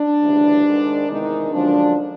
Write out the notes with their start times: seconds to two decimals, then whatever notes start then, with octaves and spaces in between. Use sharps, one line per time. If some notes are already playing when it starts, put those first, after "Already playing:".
Already playing: D4
0.21 D2 C#3 E3 G3
0.64 G#2 D#3 G#3
1.08 E2 C3 D#3 G#3 D#4
1.51 F#2 D3 F3 G#3 D4